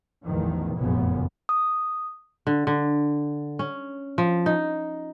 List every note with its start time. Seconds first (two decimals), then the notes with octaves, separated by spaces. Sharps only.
0.24 A1 E2 D#3 F3
0.77 F1 A#1 F#2 C#3 B3
1.49 D#6
2.47 D3
2.67 D3
3.59 C#4
4.18 F3
4.46 D#4